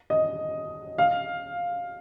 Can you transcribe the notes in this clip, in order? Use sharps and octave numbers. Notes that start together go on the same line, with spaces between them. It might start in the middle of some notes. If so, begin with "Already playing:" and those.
D#5
F5